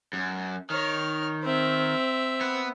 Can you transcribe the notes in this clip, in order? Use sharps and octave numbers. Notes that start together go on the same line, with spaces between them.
F#2
D#3 C#5 F6
C4 E5
B3